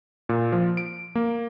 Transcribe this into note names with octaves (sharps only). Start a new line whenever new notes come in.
A#2
F3
D7
A#3